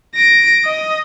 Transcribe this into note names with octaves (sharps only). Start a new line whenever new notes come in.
A#6 D7
D#5